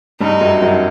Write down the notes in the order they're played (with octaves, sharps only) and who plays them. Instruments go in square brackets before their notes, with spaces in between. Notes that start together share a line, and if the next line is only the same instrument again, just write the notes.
[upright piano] G2 G3 [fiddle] D#4
[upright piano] F#2 F#3
F#2 F#3